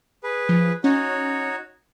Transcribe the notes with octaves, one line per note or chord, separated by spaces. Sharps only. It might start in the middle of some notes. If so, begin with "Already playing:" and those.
G#4 B4
F3
C#4 D#4 F#4 C#5